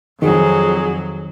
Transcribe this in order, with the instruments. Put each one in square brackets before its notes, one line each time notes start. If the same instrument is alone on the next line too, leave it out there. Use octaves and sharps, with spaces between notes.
[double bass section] F2 [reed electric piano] D#3 [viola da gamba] F#3 [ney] G#4